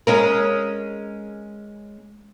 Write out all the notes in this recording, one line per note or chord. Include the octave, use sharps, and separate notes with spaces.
G#3 C#4 A#4